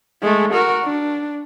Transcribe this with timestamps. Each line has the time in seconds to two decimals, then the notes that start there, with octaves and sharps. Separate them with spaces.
0.22 G#3 A3
0.53 F#4 A#4
0.84 D4